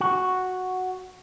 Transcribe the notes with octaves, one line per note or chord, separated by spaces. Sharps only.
F#4